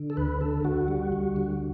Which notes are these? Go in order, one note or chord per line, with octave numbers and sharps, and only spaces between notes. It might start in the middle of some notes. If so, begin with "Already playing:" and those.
Already playing: D3
A4
D2 B4
D3 A4
D2 F#4
G3
D2
D3